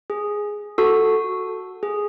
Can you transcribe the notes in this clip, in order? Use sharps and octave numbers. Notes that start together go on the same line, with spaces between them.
G#4
F#4 A4
G#4